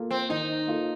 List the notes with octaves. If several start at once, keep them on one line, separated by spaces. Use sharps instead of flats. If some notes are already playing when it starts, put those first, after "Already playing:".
Already playing: A#3 F4 A4
C4
D#3 D#4
A#3 F4 A4